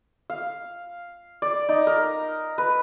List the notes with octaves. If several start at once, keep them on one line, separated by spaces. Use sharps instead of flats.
F5
D5
D#4
A#4
B4